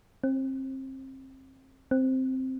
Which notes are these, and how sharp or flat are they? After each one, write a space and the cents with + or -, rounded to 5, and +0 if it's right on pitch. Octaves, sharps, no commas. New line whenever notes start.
C4 +30
C4 +0